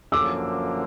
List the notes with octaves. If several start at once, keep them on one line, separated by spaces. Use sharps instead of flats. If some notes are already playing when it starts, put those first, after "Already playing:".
F#2 D3 F3 A#3 C#4 D6 E6